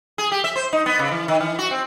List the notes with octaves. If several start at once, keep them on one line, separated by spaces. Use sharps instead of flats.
G#4
G4
E5
C5
D#4
B3
C#3
E3
D#3
E3
F#4
C4